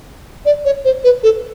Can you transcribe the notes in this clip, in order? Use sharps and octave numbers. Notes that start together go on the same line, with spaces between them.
D5
C#5
C5
B4
A4